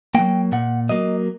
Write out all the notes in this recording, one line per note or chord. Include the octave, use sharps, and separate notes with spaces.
F#3 A#3 G5
A#2 F#5
F#3 A#3 D#5